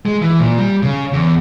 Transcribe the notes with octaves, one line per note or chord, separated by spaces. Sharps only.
G#3
E3
A#2
G3
C#3
E2